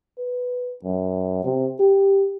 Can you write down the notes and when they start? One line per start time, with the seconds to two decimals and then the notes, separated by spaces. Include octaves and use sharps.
0.18 B4
0.84 F#2
1.44 C3
1.80 G4